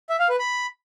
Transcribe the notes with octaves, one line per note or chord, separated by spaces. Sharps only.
E5
F5
B4
B5